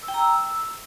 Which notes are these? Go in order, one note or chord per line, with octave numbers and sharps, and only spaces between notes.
E6
G5
A#5
E6